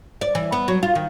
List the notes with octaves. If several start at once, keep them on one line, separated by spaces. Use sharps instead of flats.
D5
E3
B3
F#3
F4
D#3